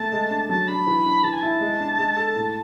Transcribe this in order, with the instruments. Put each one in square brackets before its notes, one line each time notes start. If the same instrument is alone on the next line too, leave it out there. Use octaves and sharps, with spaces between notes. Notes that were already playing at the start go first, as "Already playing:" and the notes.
Already playing: [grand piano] A3 [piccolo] A5
[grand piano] G#3
D4
[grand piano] F#3 [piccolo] A5
[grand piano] D4 [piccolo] B5
[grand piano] E3
D4
[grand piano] E3 [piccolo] A5
[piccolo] G#5
[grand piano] E4 [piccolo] A5
[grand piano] G#3
D4
G#3
A4
A2